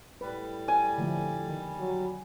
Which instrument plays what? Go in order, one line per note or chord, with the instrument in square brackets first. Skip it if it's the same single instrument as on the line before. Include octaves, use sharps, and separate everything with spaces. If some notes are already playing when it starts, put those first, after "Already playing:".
[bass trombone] A2 [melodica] G3 [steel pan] B4
[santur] G#5
[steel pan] D3 F3 A3
D#3
[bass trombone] F#3